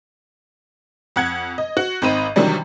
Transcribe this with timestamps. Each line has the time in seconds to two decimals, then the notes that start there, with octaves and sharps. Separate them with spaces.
1.16 F2 F#5 G#6
1.58 D#5
1.77 F#4
2.02 G#1 C4 D#4 D#5 B5 D#7
2.36 C3 D#3 E3 F#3 G3 D4